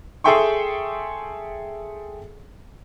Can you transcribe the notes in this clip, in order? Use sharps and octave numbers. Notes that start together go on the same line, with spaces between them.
G#4 A4 E5 G5 C6 C#6